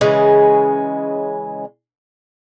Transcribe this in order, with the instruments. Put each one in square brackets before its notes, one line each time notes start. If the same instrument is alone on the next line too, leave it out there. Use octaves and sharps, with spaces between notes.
[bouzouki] C#3 E3 G#3 C#4